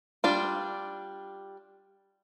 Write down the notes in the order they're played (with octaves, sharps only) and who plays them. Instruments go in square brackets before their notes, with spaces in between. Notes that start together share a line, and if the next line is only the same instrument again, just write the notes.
[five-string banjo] G3 D4 F4